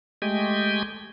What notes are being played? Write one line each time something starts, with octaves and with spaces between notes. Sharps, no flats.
G#3 A3 G4 D#5 G5 G#5